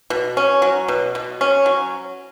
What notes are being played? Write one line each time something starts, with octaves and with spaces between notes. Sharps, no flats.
B2
C#4
F#3
B2
B2
C#4
F#3